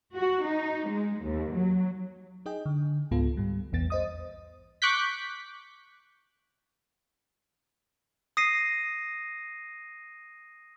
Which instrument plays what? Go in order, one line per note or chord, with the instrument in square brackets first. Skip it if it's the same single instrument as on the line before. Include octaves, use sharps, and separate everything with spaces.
[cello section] F#4
D#4
G#3
D#2
F#3
[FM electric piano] D#4 G#4 D#5 G5
D3
C#2 G#2 B3 F4 A4
G#2 G3
A#1 E2 B3 A6
C5 D#5 D#6
[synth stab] C#6 D6 F#6 G6 B6
[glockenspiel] D#6 A#6 C7 D#7